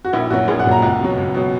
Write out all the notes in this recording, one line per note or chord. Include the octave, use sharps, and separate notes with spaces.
F#4
A#1 E4
A#2 F#3 F#4
A#1 G#4
F#5
A#2 F#3
A#5
C#2 F#5
B2 F#3
C#2
B2 F#3